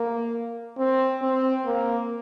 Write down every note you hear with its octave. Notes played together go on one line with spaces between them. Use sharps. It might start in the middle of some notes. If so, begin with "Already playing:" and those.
Already playing: A#3
C4
C4
A#3